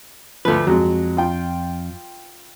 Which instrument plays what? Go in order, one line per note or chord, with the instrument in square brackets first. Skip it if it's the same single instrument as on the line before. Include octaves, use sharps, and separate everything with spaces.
[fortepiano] D2 F3 [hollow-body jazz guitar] A3 B4
[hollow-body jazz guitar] F2 [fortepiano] F#3 G#3
[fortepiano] F4 G5